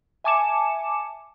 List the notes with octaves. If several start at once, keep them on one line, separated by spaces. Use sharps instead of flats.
E5 G#5 A5 D6 C#7 E7